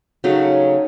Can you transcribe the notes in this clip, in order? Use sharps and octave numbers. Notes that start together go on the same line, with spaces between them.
C#3 F#3 A3 D#4